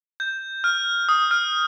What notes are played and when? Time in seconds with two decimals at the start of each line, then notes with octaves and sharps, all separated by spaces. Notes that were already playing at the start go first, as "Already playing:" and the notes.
0.20 G6
0.64 F6
1.09 D#6
1.31 F6